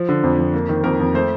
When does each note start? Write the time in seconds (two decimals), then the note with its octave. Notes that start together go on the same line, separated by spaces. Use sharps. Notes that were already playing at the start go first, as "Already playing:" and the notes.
Already playing: F3
0.09 D3
0.23 F2
0.38 F2
0.53 A#3
0.69 D#3
0.84 F2 A#4
1.00 F2
1.14 A3 C5